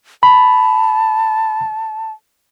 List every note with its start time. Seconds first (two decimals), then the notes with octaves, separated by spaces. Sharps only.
0.23 A5 B5